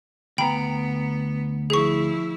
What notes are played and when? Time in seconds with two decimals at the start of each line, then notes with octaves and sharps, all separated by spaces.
0.38 D2 B3 G5 A#5 B5
1.70 F3 E4 G#4 C#6